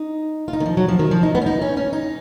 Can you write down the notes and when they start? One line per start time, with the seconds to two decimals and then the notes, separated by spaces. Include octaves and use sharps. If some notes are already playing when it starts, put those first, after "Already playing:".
Already playing: D#4
0.48 F4
0.53 D#4
0.60 D#3
0.66 F3
0.77 F#3
0.89 F3
0.99 D#3
1.11 F3
1.23 D#4
1.35 B3
1.42 C#4
1.46 D#4
1.62 C#4
1.77 C#4
1.93 D#4